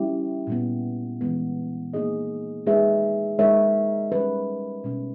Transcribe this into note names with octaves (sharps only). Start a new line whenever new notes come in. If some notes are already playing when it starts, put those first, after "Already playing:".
Already playing: G3 C#4 E4 G4
A#2 G3 B3
E3 G#3 B3
A#3 D#4 G#4 D#5
G#3 D#4 G#4 B4 E5
G#3 D#4 A#4 C#5 E5
G3 C#4 G4 B4
B2 G3 C#4